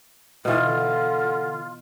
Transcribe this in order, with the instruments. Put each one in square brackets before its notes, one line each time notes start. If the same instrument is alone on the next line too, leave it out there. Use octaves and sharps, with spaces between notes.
[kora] B2 E3 [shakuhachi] F4
[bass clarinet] D3